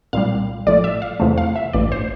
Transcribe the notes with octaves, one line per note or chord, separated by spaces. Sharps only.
C2 A#2 G3 F5
A1 A2 F3 D5
E5
F5
E2 C3 F3 A3
F5
E5
A1 G2 E3 D5
C5